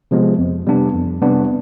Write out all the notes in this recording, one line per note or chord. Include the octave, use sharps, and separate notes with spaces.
C3 F3 G#3 B3
F2
C3 G3 B3 D4
F2
C3 G3 B3 D4